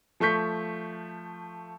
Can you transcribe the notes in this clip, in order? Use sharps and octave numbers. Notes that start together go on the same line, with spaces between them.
F3 A3 C#6 G6 B6